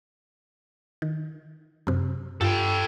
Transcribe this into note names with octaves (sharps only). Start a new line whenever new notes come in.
D#3
F#2 C3
G2 F4 G4 A4 G5